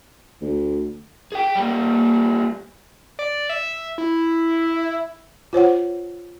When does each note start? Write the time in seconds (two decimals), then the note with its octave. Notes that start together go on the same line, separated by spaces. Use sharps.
0.41 D2
1.32 G#4 G5
1.55 G3 A#3
3.19 D5
3.49 E5
3.98 E4
5.53 F4 C5 C#5 F#5